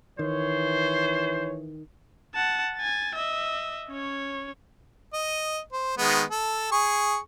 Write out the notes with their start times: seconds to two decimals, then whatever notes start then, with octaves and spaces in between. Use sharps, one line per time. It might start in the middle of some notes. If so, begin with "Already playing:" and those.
0.19 D#3 E3 C5 C#5
2.35 F#5 A5
2.77 G#5 A6
3.14 D#5 E5
3.88 C#4 C#5
5.13 D#5
5.72 C5
5.98 D#3 G#3 B3
6.31 A4
6.72 G#4 C#6